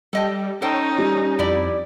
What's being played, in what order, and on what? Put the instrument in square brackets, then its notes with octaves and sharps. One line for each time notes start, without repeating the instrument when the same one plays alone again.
[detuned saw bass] G3 [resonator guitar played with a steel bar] A4 D#5 G5
[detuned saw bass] C#4 [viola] D#4 [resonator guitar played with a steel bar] A4 C5 G5
[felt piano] G3
[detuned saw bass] F2 [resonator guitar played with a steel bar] E4 G4 D5